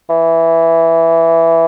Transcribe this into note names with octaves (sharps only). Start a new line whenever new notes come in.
E3